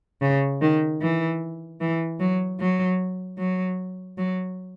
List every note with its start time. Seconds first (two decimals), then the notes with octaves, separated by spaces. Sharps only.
0.21 C#3
0.61 D#3
1.01 E3
1.81 E3
2.20 F#3
2.60 F#3
3.38 F#3
4.18 F#3